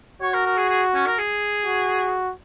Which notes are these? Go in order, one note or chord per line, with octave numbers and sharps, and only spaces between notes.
F#4 C#5
A#4
A#4
G#4
G#4
C#4
A#4
G#4
F#4